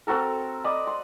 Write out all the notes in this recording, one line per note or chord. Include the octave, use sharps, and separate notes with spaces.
C4 F#4 A4 A#4
D5 D#5 B5
C6